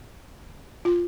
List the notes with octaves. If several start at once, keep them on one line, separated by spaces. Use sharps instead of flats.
F4